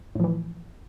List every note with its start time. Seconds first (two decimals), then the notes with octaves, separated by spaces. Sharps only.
0.15 A2
0.20 F3
0.24 E3